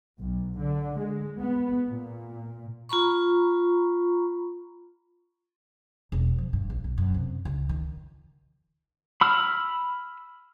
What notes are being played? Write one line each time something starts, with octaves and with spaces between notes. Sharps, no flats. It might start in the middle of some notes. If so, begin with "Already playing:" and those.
B1
D3
G#3
B3
A#2
F4 A#5 B5 C#6
E1
F3
G2
A#1
B1
F#2
C3
C#2
D#3
B5 E6 F6